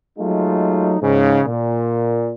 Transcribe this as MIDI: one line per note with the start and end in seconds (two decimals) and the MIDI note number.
0.19 0.97 54
0.19 0.97 56
0.19 0.97 57
0.19 0.97 63
0.19 0.97 65
1.02 1.41 44
1.02 1.41 49
1.46 2.33 46